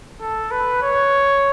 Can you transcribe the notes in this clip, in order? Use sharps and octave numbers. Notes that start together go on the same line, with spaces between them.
A4
B4
C#5